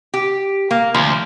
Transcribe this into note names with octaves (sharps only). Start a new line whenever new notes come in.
G4
A#3
D2 F3